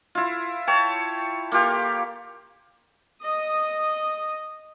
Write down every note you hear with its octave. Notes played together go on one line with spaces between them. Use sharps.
E4 F4
C#5 G5 A5
A#3 F4 G4 F5
D#5 D#6